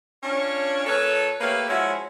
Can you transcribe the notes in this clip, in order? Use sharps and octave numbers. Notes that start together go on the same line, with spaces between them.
C#4 D4 F4 C#5
A#2 A4 B4 C#5
A3 A#3 G4 B4 C#5 F5
F3 G#3 C#4 E4 F#4 E5